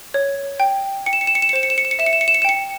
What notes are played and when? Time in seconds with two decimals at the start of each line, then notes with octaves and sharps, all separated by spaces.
0.14 C#5
0.60 G5
1.06 G5 C#7
1.13 E7
1.21 C#7
1.27 E7
1.35 C#7
1.42 E7
1.49 C#7
1.53 C5 E7
1.63 C#7
1.70 E7
1.78 C#7
1.85 E7
1.91 C#7
1.99 E5 E7
2.06 C#7
2.13 E7
2.21 C#7
2.28 E7
2.34 C#7
2.42 E7
2.45 G5 C#7